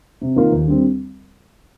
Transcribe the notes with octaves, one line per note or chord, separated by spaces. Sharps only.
C3
D#3 A#3 F4 A#4
D#2
D3 G3 C4